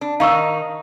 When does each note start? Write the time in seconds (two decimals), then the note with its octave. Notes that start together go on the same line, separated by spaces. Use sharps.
0.01 D4
0.20 D#3 D#4 F5 C#6 E6